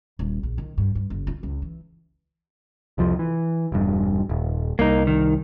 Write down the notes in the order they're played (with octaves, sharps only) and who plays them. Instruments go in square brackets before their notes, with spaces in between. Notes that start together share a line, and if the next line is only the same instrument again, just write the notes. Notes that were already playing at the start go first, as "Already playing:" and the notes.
[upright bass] D#1
A#1
D#3
G2
G2
F#1
F4
C#2
E3
[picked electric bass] C2 F2 F3
E3
E1 G2
D#1
[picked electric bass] C2 [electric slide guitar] A#3 D#4
[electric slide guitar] D#3